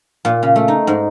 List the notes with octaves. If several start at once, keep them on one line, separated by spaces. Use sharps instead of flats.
A#2
C#3
A3
D#4
G#2